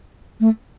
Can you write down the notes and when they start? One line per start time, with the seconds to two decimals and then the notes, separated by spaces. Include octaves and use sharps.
0.40 A3